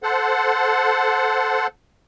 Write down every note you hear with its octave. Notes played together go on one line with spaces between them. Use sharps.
A4 C5 F#5